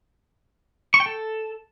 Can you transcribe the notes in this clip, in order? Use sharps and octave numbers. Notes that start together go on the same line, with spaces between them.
C#6
G5
A4